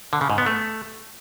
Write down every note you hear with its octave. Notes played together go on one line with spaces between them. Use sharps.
D3
C#3
G#2
B3
A3